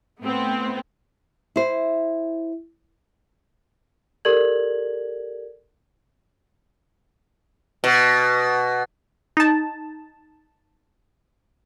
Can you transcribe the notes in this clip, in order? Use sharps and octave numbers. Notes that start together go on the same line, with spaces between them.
A2 B3 C4
E4 C5
G4 A4 A#4 D5 G#6 F#7
B2
D#4 A5